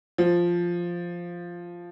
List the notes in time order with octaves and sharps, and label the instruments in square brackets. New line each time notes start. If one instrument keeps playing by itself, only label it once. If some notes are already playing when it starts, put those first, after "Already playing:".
[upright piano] F3